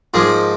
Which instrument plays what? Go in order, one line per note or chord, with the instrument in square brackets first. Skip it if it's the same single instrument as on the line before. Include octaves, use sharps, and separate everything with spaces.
[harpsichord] G#2 F3 A#3 [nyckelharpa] G#4